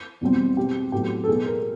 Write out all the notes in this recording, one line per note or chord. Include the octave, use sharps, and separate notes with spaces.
E2 B2 G3 C4
B2 G#3 C4 G4
A2 F#3 B3 G4
A4
B2 G#3 B3 G#4
A#4